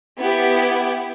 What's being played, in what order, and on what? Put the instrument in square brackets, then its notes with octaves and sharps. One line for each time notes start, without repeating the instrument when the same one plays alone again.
[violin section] B3 E4 G4